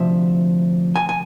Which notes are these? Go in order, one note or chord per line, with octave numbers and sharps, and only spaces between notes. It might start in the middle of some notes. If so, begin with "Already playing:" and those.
Already playing: D2 C3 F3 E5
G#5
G#5